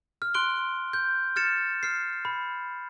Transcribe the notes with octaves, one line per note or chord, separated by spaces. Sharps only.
F6
C6 F#6 D7 G7
G6
F6 G#6 A6 C#7 E7
F6 C7
B5